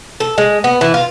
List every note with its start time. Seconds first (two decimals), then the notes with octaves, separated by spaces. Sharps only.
0.20 A4
0.38 G#3
0.64 B3
0.81 E3
0.94 F4